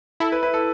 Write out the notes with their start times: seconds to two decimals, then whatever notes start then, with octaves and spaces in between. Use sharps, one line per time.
0.20 E4 A4
0.32 B4
0.43 B4
0.54 A4